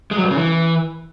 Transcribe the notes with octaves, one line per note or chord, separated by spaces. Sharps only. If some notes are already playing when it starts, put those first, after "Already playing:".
G#3
F#3
G2
C#3
E3